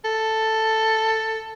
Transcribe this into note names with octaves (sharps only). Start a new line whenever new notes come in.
A4